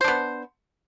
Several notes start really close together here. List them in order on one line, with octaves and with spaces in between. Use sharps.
C5 D4 B3